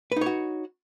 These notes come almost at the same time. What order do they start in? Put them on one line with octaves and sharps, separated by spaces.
B4 D#4 C#5 F#4